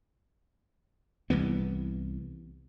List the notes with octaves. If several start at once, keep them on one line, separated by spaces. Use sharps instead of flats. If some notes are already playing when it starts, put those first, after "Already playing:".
C2 E3 B3